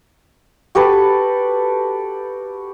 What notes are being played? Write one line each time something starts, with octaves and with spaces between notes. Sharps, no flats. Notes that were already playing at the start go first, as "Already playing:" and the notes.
F#4 G4 A4 B4